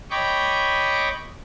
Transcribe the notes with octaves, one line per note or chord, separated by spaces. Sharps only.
C#5 D#5 G5 B5 C#6 D6